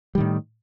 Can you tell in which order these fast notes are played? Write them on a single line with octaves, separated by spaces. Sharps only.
G3 D#3 A2